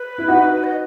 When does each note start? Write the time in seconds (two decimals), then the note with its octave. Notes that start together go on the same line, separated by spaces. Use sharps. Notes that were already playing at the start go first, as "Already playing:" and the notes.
Already playing: B4
0.18 E4
0.28 D#4 F#4
0.64 D#5